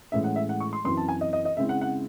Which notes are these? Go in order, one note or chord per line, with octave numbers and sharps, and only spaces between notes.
A2 E3 G#3 C#4 E5
F#5
E5
F#5
C#6
C6
F#2 E3 C4 E4 C6
A5
G#5
D#5
D#5
D#5
C#3 G#3 C4 E4 E5
F#5
F#5